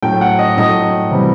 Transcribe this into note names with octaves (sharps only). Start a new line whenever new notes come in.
A2 F#3 A3 G5
F#5
D#5
A2 F#3 A3 D#5
C3 E3 G3